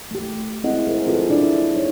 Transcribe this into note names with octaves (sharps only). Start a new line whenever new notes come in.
A3 G4
G#3 C4 E4 G#4 D#5 F#5
G#4 A#4 C5
C4 F4 G#4 A4 B4
D4 E4 D5
G3 D#4 C#5